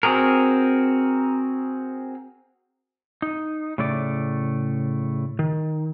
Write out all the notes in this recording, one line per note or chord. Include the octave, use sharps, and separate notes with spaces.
C4 F#4 G#4 A#4
D#4
A2 C#3 A3 D5
D#3